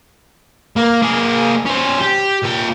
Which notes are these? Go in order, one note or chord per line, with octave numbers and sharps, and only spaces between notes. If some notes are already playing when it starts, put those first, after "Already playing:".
A#3
A#3 G#4
C#4 C5
G4
A#2 G5